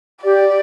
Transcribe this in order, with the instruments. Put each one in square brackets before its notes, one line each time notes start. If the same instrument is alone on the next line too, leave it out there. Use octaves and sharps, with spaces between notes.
[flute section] G4 [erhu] D5